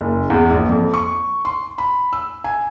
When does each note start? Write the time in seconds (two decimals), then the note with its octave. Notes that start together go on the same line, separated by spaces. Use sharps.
0.01 F#1
0.30 E2
0.50 A#1
0.69 F2
0.94 C#6
1.45 C6
1.78 B5
2.13 E6
2.44 G#5